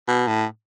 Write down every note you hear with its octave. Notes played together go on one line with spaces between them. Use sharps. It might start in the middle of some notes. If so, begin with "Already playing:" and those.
B2
A2